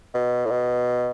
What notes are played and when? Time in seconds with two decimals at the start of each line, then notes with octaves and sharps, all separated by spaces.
0.14 B2
0.45 A2
0.50 B2